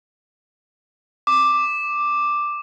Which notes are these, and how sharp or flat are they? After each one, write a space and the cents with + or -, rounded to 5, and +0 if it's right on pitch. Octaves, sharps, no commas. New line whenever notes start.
D6 +5